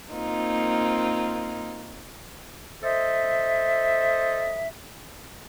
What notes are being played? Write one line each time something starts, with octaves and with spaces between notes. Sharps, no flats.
A#3 C4 D#4 F4
A4 C5 D#5 E5